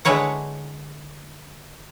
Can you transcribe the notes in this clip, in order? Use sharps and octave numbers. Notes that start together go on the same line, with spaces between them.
D3 G#3 E4 B4 C#5 F#5